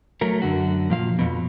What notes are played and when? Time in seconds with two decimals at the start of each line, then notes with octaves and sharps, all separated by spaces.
0.21 F#3 A3 A#4
0.42 F#2 D3 F#4
0.90 A#2 F3 F5
1.19 F2 B2